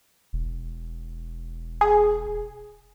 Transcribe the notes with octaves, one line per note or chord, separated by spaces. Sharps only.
E1
G#4